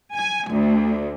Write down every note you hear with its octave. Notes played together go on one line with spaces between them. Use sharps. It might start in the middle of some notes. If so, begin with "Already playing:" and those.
G#5
D2